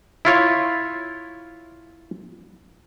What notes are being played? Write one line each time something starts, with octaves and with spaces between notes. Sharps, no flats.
E4 F4 C#5